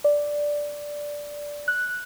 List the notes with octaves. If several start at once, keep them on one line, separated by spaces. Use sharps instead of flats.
D5
F#6